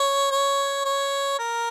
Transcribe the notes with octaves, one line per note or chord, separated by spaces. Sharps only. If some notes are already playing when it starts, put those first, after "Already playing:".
Already playing: C#5
C#5
C#5
A#4